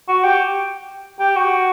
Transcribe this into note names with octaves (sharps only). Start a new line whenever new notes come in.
F#4
G4
G4
F#4